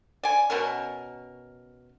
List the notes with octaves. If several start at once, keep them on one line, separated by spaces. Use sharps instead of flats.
D5 G#5
B2 C#4 A#4